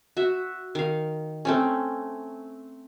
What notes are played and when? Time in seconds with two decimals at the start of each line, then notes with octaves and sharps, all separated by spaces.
0.17 F#4 E5
0.75 D#3 F5
1.45 A3 C4 C#4